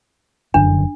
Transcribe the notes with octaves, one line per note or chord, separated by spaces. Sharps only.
F1 F#2 D3 D4